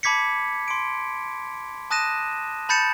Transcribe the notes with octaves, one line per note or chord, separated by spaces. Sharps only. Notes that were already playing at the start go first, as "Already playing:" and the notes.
A5 B5 D6 G#6 B6 C#7
C6 D7
A5 D#6 F#6 A#6 D#7 E7
A5 B5 G6 A6 C#7 E7